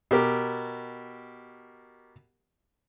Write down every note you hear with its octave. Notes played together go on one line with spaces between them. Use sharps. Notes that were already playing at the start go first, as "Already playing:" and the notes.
B2 G4 A#4